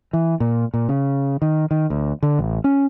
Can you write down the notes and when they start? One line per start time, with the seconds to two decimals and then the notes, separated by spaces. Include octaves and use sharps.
0.13 E3
0.40 A#2
0.74 A#2
0.89 C#3
1.42 D#3
1.71 D#3
1.90 D2
2.23 D3
2.39 A1
2.64 C#4